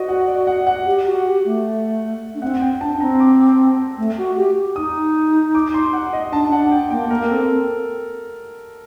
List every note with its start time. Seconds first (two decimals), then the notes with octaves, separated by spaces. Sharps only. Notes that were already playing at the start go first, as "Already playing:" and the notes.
Already playing: F#4 C5 D5 D#5
0.08 F#5
0.28 D5
0.47 F#5
0.67 F#5
0.86 G4
1.06 F#4
1.26 G4
1.45 A3
2.35 D4
2.42 C4 F#5
2.61 G5
2.81 D4 A5
3.00 C4 A#5
3.20 D6
3.98 A3
4.18 F#4
4.37 G4
4.76 D#4 D#6
5.55 D6
5.74 C6
5.93 F#5
6.13 D#5
6.32 D4 A5
6.51 D4 F#5
6.71 G5
6.90 A#3 G5
7.10 A#3 A#4
7.30 C4 A4